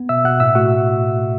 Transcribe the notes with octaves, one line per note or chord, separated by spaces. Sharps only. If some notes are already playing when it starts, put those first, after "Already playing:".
Already playing: B3
B2 E5 E6
B2 F#5 F#6
A2 E5 E6
A3 F#4 F#5